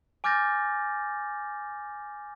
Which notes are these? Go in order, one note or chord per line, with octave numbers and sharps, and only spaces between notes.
G#5 D6 F6 G6 A6 A#6